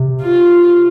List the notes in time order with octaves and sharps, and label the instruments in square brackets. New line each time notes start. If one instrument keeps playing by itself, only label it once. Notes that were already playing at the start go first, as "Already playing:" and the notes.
Already playing: [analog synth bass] C3
[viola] F4